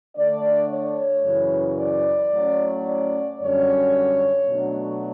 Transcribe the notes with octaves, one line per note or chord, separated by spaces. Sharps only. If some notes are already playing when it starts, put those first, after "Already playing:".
D3 A3 D4 D5
C#5
F#2 C#3 E3
D5
A2 F#3 C#4
D5
F#2 D3 G3 C#4 C#5
B2 F#3 A3 D4